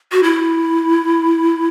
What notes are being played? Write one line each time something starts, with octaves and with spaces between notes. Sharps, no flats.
F#4
E4